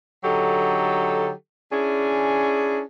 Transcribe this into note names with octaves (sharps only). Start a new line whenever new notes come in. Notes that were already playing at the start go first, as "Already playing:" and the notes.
D3 F#3 D#4 G4 A4
C#4 D4 E4 G#4